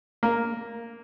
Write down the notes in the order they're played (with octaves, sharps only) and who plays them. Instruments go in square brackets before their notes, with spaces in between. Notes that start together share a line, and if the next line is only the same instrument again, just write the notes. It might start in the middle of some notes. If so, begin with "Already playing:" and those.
[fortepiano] A#3